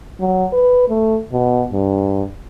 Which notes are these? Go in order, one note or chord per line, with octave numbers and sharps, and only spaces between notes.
F#3
B4
A3
B2
G2